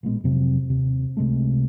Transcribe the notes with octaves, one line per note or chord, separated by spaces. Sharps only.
A1 A#2 G#3 B3
F2 C3 F#3
D#2 C3
C#2 C3 G#3 A3